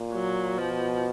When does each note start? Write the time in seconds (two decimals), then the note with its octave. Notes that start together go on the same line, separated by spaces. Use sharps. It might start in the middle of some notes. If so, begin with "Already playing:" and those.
Already playing: A#2
0.13 F#3
0.58 B2 F3